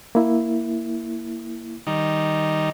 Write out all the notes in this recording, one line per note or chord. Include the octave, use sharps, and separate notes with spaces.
A#3 E4
D#3 G3 D#4